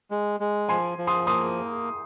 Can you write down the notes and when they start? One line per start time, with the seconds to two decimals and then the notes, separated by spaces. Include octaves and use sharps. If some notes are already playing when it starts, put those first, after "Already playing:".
0.11 G#3
0.40 G#3
0.69 F3 G#5 C6
0.98 F3
1.07 C6 D#6
1.27 A#3 C6 D#6